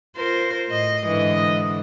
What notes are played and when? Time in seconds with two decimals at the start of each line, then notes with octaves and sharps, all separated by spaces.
0.16 F4 A#4 C5
0.68 A2 D#5
1.05 G#2 D3 E3 D#5